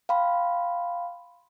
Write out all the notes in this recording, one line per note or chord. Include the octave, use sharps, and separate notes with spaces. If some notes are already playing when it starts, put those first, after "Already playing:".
F5 G5 B5 C6